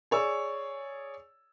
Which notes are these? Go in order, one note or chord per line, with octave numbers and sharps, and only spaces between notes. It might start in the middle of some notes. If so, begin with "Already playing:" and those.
G#4 C#5 D5 E6